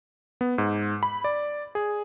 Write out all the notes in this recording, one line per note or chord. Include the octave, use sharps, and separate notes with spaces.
B3
G#2
B5
D5
G#4